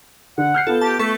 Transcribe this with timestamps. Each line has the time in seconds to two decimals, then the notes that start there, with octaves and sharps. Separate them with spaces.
0.38 D3 F#5
0.54 F6 G6 C7
0.67 B3 F4 A4
0.81 G4 A5
0.99 A3 A4 C#6 B6